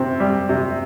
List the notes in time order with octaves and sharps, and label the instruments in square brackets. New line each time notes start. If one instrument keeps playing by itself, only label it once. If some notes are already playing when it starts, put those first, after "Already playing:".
Already playing: [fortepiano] C3 [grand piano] C4
[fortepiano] G3
C3